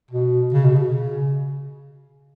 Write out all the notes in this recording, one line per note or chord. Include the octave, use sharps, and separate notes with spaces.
B2
C#3
B2
C#3